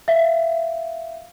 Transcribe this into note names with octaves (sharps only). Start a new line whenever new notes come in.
E5 F5